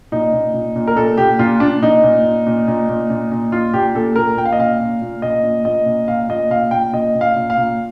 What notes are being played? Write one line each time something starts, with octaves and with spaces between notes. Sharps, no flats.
A#2 D#4
A#2
A#2
A#2
A#4
A#2 A4
A#2 G4
A#2 F4
A#2 D4
A#2 D#4
A#2
A#2
A#2
A#2
A#2
A#2
A#2
A#2 F4
A#2 G4
A#2 A4
A#2 A#4
A#2 G5
F5
D#5
A#2 F5
A#2
A#2
A#2 D#5
A#2
A#2 D#5
A#2
A#2 F5
A#2 D#5
A#2 F5
A#2 G5
A#2 D#5
A#2
F5
A#2
F5
A#2